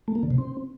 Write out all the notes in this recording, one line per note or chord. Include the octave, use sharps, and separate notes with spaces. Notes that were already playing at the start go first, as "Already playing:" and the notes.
A3
A#3
D3
C3
C4